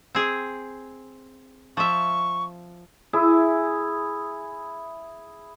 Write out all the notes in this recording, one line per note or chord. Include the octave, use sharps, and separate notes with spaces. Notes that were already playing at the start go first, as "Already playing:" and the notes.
C4 G#4
F3 E5 C#6
E4 G#4 E5